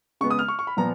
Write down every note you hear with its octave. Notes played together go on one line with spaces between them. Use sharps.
C#3 G#3 B3 C#6
D#6
F6
C#6
C#6
B5
A#2 F3 B3 A#5